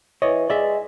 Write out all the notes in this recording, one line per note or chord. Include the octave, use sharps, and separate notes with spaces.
E3 C#5 D#5
G#3 D5 E5